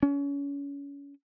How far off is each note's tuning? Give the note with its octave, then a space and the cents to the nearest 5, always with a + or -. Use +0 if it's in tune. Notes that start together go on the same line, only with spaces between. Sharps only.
C#4 +30